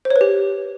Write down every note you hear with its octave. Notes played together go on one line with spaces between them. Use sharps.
C5
C#5
B4
G4